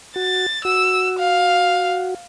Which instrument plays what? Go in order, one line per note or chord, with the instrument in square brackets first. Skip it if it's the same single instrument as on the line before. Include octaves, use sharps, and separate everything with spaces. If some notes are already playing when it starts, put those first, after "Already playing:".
[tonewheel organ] F#4 [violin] A6
[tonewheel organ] F#4 [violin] E6
[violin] F5